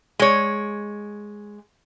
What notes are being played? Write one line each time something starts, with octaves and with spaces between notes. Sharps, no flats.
G#3 C#5